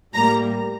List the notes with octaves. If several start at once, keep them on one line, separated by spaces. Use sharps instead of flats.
A2 G3 A#3 A#5